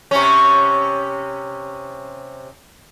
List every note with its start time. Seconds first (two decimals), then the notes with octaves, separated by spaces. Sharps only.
0.11 C3 C#4